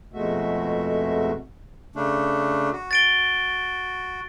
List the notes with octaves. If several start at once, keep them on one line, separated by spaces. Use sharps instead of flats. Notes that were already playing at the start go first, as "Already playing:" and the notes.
F2 B2 G#3 A3 F#4 E5
C#3 A3 D4
F#4
A6 D7 G7